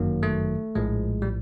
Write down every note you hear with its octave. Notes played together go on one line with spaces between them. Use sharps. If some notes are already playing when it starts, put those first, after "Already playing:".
Already playing: G1 F#2 D#3 F#3 A#3
A3
A#1 A2 F3 G#3
G3